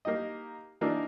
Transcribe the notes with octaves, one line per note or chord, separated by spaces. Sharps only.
A#3 D#4 G4 D#5
E3 A#3 D4 D#4